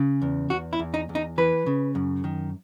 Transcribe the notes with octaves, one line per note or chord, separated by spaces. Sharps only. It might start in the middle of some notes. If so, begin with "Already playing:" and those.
Already playing: C#3
E2
E2 F#4
E4
E2
D#4
E2
D#4
E3 B4
C#3
F#2
D#3